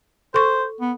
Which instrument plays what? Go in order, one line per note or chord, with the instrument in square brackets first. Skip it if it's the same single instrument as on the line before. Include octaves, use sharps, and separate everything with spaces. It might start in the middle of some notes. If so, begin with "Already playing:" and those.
[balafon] A4 C#6 [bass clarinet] C5
[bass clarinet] B3